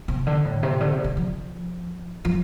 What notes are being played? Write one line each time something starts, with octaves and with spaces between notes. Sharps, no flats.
C3
D3
A2
C3
D3
C3
C3
F3
F3